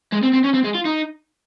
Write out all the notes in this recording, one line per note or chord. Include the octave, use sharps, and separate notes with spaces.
G#3
C4
C4
C#4
C4
G#3
F4
D#4